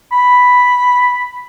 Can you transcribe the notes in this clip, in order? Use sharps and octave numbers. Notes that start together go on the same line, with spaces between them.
B5